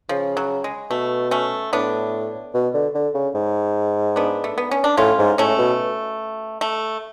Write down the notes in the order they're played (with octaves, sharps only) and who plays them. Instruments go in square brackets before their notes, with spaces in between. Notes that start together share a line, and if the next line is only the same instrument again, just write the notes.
[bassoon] C#3 [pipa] F3
[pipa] F#3
G#3
[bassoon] B2 [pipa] A3
[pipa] A3 C#4
[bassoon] A2 [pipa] B3 D4
[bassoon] B2
D3
D3
C#3
G#2
[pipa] B3 D4
A3
B3
C#4
D4
[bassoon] A2 [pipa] C#4 F4
[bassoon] G#2
[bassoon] A2 [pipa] A3 C#4
[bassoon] B2
[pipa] A3